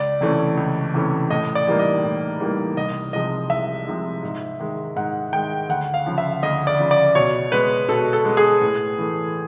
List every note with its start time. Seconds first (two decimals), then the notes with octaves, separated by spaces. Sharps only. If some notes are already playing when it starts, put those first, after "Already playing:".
Already playing: C#2 D5
0.21 C3 E3 A3 C#4
0.57 C#2
0.94 C3 E3 A3 C#4
1.30 A2 D#5
1.55 D5
1.67 E3 G3 A#3 D#4
1.79 D#5
2.04 A2
2.40 E3 G3 A#3 D#4
2.77 C2 D#5
3.13 C3 F3 G#3 D#5
3.50 C2 E5
3.87 C3 F3 G#3
4.23 G#2
4.59 D#3 G#3
4.96 G#2 F#5
5.33 D#3 G#3 G5
5.69 D2 F#5
5.94 F5
6.06 C#3 F3
6.18 E5
6.43 D2 D#5
6.67 D5
6.79 C#3 F3
6.91 D5
7.15 B2 C#5
7.52 G#3 B3 B4
7.89 B2 A4
8.13 A4
8.25 G#3 B3
8.37 G#4
8.61 A2
8.98 E3 A3